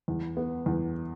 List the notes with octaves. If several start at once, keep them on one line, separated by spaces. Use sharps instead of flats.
E2
B3
E2